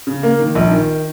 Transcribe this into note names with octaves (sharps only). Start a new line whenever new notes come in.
C#3
A#3
D#3
A#1
D#3